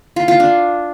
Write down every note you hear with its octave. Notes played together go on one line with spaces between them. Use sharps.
F4
F4
D4